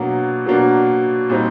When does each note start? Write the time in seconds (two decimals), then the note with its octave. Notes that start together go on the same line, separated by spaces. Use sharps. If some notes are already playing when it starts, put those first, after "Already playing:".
Already playing: B2 F#3 A#3 D4
0.46 B2 F#3 A#3 D4
1.30 A#2 G3 C4 D#4